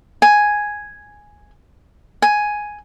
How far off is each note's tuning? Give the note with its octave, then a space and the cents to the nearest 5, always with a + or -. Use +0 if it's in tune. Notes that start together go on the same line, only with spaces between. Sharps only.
G#5 +0
G#5 +5